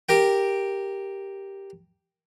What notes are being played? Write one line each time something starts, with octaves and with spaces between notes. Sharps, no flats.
G4 A#4 G5